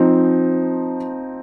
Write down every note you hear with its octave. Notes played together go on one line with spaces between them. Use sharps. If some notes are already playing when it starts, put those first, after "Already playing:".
Already playing: F3 C4 D#4